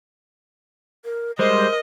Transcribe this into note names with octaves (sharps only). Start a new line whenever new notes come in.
A#4
G3 G#3 A#4 C5 D#5